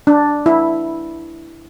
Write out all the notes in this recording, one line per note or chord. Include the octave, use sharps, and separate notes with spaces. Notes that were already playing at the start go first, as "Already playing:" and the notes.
D4
E4